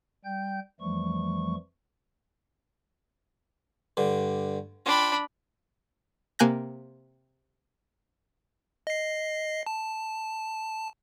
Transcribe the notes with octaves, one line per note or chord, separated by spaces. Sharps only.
G3 G5 G6
F2 E3 F3 G3 A3 C#6
G2 D3
D4 F4 G5 B5
C3 A#3 G#5 F#6 G6 A#6
D#5 C7
A5